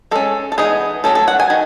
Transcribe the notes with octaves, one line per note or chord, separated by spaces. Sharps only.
G#3 C#4 A4
A4
E3 B3 D#4 G#4
F#3 A3 C#4 A4
A4
F#5
G#5
D#3